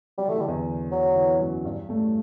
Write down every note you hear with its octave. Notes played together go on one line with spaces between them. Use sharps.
F#3 G3
E3 A3
D3 G3
E2 E3
D3 F#3
E2 E3
F#2 F#3
G2 G3
A2 A3